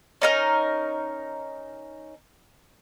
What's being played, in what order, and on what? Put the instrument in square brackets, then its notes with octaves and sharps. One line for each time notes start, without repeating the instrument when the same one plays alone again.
[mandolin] C#4 D#4 A#4